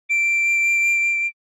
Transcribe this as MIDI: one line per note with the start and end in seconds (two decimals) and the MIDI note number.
0.10 1.27 98